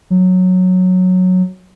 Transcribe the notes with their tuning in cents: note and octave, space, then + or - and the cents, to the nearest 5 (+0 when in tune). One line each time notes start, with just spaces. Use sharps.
F#3 -10